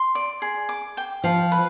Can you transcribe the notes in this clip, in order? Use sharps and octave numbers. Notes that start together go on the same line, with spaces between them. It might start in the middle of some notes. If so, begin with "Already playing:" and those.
Already playing: C6
D5
G#4
D6
G5
F3 F5
B4